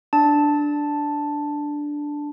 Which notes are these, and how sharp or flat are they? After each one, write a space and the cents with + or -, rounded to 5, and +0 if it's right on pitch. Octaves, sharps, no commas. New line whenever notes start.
D4 +0 A5 +0